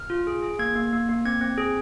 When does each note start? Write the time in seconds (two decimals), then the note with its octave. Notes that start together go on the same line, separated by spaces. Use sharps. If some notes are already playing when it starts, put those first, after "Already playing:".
Already playing: F6
0.10 F4
0.27 G#4
0.43 G#4
0.59 A#3 G#6
0.75 A#3
0.93 A#3
1.09 A#3
1.25 C4 G#6
1.41 C4
1.58 G#4